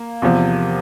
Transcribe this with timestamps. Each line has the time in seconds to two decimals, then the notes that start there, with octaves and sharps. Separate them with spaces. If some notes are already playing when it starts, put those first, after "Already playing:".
Already playing: A#3
0.22 E2 C3 F3